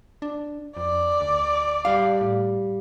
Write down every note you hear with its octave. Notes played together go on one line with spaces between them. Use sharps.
D4
F2 D5
D2
G3 F5
A2